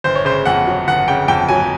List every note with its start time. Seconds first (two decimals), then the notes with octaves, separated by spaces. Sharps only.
0.04 G1 C5
0.15 C#5
0.25 C#3 C5
0.45 F2 F#5
0.67 F#3
0.87 G1 F#5
1.08 C#3 G5
1.28 F2 G5
1.49 F#3 G#5